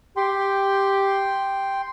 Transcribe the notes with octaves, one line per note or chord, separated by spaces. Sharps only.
G4 G5 C6